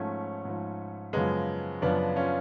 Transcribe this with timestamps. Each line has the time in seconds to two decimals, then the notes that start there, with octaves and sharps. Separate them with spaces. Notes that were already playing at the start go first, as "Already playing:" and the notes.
Already playing: G#2 F3 A3 C#4
0.45 G#2 F3
1.13 F#2 C#3 F3 G#3 B3
1.82 F#2 C#3 F3 B3 D4
2.16 C#4 F4